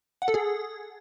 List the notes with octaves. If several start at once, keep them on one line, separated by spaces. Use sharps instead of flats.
F#5
A4
G#4